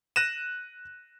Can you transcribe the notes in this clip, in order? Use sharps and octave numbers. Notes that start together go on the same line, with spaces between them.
F#6 A#6 D#7 E7